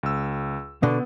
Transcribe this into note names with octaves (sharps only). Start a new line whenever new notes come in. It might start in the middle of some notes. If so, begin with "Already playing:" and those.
C#2 E6
B2 D3 B3